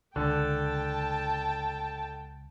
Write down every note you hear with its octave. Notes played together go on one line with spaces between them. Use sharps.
C#2 D3 G5 A5